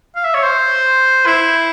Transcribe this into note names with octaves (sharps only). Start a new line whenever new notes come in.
F5
E5
C#5
C5
E4